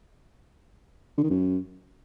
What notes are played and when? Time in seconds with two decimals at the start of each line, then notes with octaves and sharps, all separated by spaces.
1.18 D3
1.24 D#3
1.30 F#2